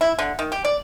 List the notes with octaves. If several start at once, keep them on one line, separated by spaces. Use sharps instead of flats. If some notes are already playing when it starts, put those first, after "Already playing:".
E4
D3
D#3
G4
D5